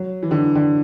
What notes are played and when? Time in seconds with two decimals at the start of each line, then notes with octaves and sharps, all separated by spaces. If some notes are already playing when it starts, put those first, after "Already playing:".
Already playing: F#3
0.23 E3
0.31 D3
0.37 E3
0.55 D3